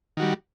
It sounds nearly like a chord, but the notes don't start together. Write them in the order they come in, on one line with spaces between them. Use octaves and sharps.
D#3 F#4 G3